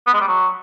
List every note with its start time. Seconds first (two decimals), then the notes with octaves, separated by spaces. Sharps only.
0.07 B3
0.14 G#3
0.21 G3
0.28 F#3